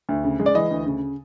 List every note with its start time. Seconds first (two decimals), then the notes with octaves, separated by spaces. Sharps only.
0.09 D2
0.24 C#3
0.40 G#3
0.46 D5
0.55 E3 D#5
0.71 D2
0.86 C#3